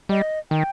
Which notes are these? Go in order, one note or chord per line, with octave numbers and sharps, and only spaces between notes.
G3 D#5
D#3 G5